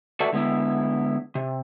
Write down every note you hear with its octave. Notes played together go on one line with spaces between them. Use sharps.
F#4 A4 B4 D5 E5 A5
D3 G#3 B3 E4
C3